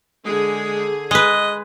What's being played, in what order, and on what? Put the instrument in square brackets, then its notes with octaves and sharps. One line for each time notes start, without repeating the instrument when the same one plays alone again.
[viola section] D3 G#4 [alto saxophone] G#3
[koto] G#3 B4 [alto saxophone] D#5